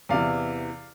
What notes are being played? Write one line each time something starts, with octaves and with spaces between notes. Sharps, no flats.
E2 C3 E3 D5 F5